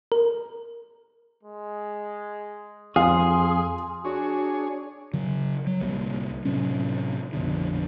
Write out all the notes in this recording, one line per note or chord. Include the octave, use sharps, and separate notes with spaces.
A#4
G#3
F2 G#4 F5 C6
D4 F#4 G#4 C#5
C#3 F#3
F#3
D1 C2 G3 A#3
A2 C3 F#3 C#4
A#1 F2 B2 D3